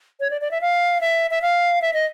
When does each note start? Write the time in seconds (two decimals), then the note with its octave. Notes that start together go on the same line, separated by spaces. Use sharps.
0.20 C#5
0.30 D5
0.41 D5
0.51 E5
0.61 F5
1.01 E5
1.31 E5
1.42 F5
1.82 E5
1.94 D#5